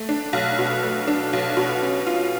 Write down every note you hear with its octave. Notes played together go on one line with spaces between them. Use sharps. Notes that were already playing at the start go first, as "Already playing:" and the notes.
Already playing: A3
D4
B1
B2
A3
D4
B1
B2
C#4
F4